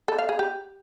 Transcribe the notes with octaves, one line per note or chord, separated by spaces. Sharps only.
A4
F5
G#4
G4